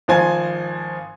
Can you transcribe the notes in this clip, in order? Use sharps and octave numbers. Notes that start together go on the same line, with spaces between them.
G#1 F3 C5 G#5 G#6